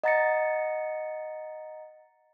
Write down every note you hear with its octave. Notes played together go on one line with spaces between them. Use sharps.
D#5 F#5 A#5 A6 A#6 C#7